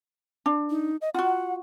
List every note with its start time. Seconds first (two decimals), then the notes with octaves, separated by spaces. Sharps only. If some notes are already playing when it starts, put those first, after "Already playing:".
0.46 D4
0.70 D#4
1.01 D#5
1.14 F4 F#4 F#5